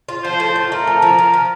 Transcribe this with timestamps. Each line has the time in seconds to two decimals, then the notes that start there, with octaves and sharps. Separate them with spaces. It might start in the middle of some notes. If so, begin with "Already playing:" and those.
0.09 F4
0.24 F3 C5
0.40 A2
0.56 F4
0.72 A3 A#4
0.87 F3
1.02 F3
1.18 F3
1.34 F3